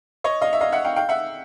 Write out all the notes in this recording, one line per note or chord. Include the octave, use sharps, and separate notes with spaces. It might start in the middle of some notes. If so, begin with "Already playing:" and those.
C#5 D#5
D#5 F5
E5
D#5 F5
E5 F#5
F5 G5
F5 G5
E5 F#5